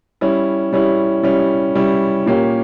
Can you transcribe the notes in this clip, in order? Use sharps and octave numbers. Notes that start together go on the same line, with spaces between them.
G3 C#4 E4
G3 C#4 E4
G3 C#4 E4
G3 C#4 E4
A#2 A#3 C#4 G4